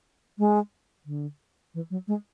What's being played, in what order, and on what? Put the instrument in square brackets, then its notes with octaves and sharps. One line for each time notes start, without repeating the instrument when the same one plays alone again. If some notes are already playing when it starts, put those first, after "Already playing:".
[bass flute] G#3
D3
E3
F#3
G#3